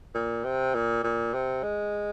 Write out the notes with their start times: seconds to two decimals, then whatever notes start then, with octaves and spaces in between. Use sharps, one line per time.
0.15 A#2
0.44 C3
0.75 A#2
1.04 A#2
1.34 C3
1.63 G#3